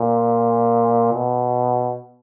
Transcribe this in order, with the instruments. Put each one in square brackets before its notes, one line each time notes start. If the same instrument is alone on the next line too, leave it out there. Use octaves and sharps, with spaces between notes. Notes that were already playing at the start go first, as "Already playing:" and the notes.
Already playing: [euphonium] A#2
B2